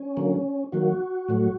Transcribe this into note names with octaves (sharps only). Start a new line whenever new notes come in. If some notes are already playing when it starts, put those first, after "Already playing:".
Already playing: C#4
D3 F#3 A#3
D#3 F#3 A#3 F#4
A2 F#3 A3